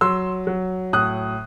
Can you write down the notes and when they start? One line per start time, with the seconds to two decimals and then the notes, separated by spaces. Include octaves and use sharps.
0.01 F#3 C6 E6
0.47 F#3
0.93 A2 D#6 F#6